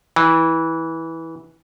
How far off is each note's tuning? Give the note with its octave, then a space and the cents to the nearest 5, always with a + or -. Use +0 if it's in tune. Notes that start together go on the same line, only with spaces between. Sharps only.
E3 -15